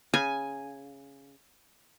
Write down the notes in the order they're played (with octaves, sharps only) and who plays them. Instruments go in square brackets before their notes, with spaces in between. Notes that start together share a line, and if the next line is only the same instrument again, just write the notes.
[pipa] C#3 [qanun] G#5